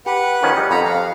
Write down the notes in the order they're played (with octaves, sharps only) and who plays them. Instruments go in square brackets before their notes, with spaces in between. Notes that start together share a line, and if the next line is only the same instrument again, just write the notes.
[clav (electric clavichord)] G4 [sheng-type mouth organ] B4 F#5
[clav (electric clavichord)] D#3 F3 C#4
G3 D#5
[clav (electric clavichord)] F2 [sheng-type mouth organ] F#5 A#5 B5
[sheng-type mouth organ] F5